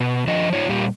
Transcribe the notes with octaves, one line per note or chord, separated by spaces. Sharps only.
B2
F3 D4 D#5
D#4 F4 C#5
A#2 G3 A#3 G4